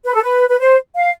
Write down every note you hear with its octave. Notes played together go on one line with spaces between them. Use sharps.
B4
A4
B4
B4
C5
F5